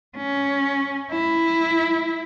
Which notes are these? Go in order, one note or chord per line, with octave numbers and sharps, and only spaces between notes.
C#4
E4